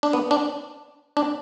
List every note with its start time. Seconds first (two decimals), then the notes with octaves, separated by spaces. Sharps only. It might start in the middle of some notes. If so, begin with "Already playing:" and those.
0.03 D4
0.13 B3
0.31 D4
1.17 D4